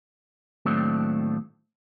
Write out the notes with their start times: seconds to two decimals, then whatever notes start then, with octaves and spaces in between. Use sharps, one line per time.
0.65 D#2 A2 F#3 A3 C4 D4